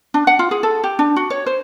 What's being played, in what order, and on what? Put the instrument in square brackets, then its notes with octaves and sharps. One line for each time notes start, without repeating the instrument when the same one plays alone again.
[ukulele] D4
F#5
F4
G#4
A4
G4
D4
F#4
C#5
C5